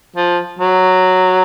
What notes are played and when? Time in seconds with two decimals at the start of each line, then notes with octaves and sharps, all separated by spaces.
0.16 F3
0.59 F#3